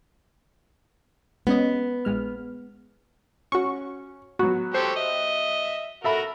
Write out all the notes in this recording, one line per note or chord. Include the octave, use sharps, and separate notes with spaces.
G#3 B3 C#4 D#5
A#1 G#3 F6
C#4 F#4 C#6
F#3 B3 F#4
G4 A4 C5 C#6
D#5 E5
F#4 A4 A#4 E5 B5